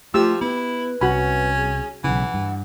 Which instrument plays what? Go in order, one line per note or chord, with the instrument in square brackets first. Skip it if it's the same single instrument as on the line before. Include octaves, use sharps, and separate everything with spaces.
[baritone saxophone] F3 [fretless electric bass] A3 [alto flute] F4 [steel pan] G4 E6
[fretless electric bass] B3 [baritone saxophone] E4 [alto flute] B4
[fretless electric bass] C2 [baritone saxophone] C#4 [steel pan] F#4 B5
[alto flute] G#4
[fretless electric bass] B1 C#3 [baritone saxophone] E3 [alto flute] F#5
[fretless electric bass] G2